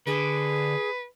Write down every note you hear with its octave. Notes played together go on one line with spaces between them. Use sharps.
D3 G#4 B4